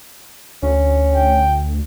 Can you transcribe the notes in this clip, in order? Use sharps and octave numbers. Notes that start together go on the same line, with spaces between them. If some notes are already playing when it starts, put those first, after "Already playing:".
D2 C#4
G5